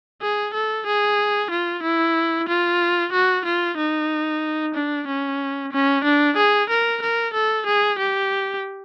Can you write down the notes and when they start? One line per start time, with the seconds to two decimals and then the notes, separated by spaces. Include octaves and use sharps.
0.22 G#4
0.54 A4
0.87 G#4
1.51 F4
1.83 E4
2.49 F4
3.13 F#4
3.45 F4
3.77 D#4
4.75 D4
5.08 C#4
5.73 C#4
6.05 D4
6.37 G#4
6.70 A#4
7.02 A#4
7.34 A4
7.66 G#4
7.99 G4